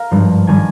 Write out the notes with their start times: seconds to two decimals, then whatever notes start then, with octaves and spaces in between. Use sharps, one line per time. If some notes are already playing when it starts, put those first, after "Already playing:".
Already playing: A#4 F5
0.11 G#1 G2 F3
0.47 D#3 G3 G#5